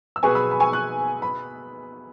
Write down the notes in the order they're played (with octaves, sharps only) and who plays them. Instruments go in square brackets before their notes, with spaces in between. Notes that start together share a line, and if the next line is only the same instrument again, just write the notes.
[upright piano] E6
[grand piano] B2 B3 G#4 B4 [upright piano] G#5 C#6
[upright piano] B5 E6
B5
G#5 C#6
C#6 F#6
B5